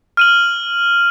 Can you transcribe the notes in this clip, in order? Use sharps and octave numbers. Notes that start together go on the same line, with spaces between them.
F6 D#7 F#7